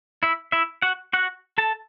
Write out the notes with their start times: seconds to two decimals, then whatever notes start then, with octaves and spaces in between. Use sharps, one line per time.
0.23 E4 E5
0.52 E4 E5
0.82 F#4 F#5
1.13 F#4 F#5
1.58 A4 A5